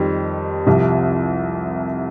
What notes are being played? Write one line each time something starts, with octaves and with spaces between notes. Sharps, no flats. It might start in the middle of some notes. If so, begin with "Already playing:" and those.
Already playing: F2 D#3 G3 C4
C2 C3 F3